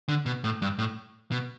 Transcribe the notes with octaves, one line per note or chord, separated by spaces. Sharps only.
D3
B2
A2
G2
A2
B2